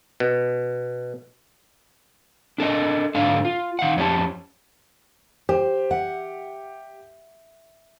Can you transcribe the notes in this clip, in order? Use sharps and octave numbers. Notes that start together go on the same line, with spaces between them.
B2
D4 A4 A#4 D#5
G#2 D3 D4 A4 F5
F4
D#3 F5 F#5
F2 C#4 D4 G4 A5
G4 C5
E5 F#5